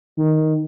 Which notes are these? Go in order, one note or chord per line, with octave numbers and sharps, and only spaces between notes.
D#3